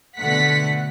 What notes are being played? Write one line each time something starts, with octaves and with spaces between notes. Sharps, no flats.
B2 D3 A3 F#5 B6